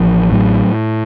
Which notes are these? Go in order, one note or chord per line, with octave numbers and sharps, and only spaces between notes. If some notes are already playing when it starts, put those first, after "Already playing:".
Already playing: A1 F3
A2 F#3